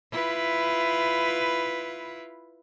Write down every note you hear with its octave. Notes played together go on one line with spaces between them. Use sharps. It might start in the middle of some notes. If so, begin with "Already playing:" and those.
E4 F4 B4